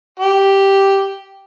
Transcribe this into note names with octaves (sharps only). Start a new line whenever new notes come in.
G4